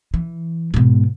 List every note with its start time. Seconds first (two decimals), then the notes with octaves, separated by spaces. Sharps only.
0.14 E3
0.74 G#2 B2